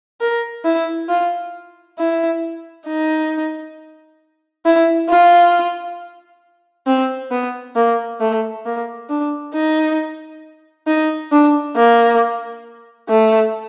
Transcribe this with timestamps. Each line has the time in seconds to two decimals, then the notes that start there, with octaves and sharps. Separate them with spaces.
0.21 A#4
0.65 E4
1.09 F4
1.98 E4
2.87 D#4
4.65 E4
5.09 F4
6.87 C4
7.31 B3
7.76 A#3
8.20 A3
8.65 A#3
9.10 D4
9.54 D#4
10.87 D#4
11.32 D4
11.76 A#3
13.09 A3